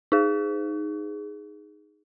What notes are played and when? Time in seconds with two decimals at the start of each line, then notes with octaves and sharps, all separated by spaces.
0.12 D#4 G#4